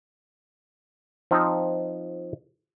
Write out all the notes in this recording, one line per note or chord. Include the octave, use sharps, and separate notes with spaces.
F3 C4 D#4 F4